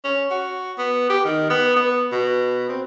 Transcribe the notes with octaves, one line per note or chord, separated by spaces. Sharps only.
C#4
F#4
B3
G4
D#3
B3
B3
B2
C4